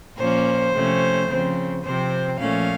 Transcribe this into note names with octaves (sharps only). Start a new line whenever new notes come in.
A#2 F3 A#3 C#4 C5
C3 F3 A3 C#4
C#3 F3 C4
C3 F3 C4 C5
A#2 F3 A3 C#4 F5